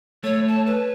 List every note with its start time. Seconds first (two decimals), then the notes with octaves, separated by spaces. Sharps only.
0.24 A3 C#5
0.48 A5
0.66 B4